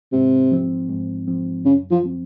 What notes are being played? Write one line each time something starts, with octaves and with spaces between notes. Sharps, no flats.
G#2 C3
F3 C4
G#2
F3 C4
F#2 C#3
F3
F3 C4